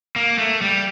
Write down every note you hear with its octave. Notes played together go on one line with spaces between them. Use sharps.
A#3
A3
G3